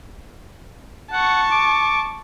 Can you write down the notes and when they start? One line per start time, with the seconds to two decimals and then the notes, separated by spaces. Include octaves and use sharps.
1.12 F#5 A5 C#6
1.51 D6